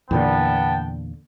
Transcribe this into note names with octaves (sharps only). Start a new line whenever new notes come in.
E2 A#2 D3 B3 G5 A5